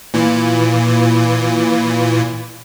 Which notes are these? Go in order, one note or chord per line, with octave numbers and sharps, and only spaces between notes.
A#2 E3